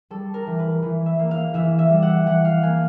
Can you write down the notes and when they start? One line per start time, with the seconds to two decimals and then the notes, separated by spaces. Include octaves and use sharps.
0.10 G3 A4
0.34 A#4
0.47 E3
0.59 B4
0.82 E3
1.06 E5
1.19 A#3
1.31 F5
1.54 E3 E5
1.79 E5
1.90 G3
2.02 F#5
2.26 E3 F#5
2.45 F5
2.62 A#3 G#5